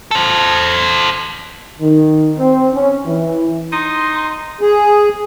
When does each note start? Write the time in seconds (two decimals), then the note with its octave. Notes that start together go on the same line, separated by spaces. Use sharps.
0.11 A4 C5
1.80 D#3
2.37 C4
2.73 C#4
3.05 E3
3.72 D#4 C6
4.61 G#4